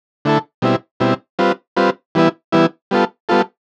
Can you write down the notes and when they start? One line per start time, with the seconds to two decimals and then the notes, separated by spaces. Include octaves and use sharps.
0.25 D3 A3 E4 A4
0.62 B2 G3 C4 E4
1.00 B2 G3 C4 E4
1.39 G3 C4 F4 B4
1.77 G3 C4 F4 B4
2.15 E3 G3 B3 E4
2.52 E3 G3 B3 E4
2.91 G3 B3 F4 A4
3.29 G3 B3 F4 A4